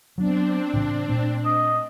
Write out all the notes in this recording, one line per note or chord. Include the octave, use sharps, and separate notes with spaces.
F#3 B3 C4 D4
A2 C#3 E3
A#2 A3
D#5